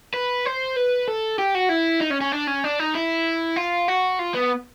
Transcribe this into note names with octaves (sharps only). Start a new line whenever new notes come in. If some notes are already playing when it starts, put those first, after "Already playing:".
B4
C5
B4
A4
G4
F#4
E4
D#4
C#4
C#4
D4
C#4
D4
D#4
E4
F4
F#4
F4
B3